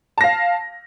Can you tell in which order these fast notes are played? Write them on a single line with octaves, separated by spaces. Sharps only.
A5 A#6 F5